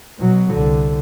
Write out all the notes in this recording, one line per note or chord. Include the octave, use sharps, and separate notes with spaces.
B2 F#3
C2 D3